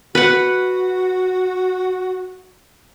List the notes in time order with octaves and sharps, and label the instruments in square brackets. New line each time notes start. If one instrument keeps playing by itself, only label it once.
[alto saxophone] F#4 [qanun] B4 F#5